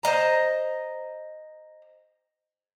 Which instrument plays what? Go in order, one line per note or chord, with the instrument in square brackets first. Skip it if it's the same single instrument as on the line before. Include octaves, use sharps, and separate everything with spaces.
[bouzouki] C5 D5 D#5 A#5